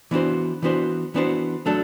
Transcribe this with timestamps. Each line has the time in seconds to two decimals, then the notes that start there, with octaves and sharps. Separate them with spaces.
0.11 E3 B3 D4 F#4 C5
0.63 E3 B3 D4 F#4 C5
1.14 E3 B3 D4 F#4 C5
1.66 F#3 A3 D4 A4